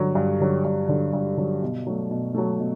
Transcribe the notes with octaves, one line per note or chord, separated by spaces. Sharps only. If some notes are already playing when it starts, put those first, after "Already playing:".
Already playing: G2 D3 F#3
G2
D3 F#3
G2
D3 F#3
G2
D3 F#3
B2
F#3 A3
B2
F#3 A3
B2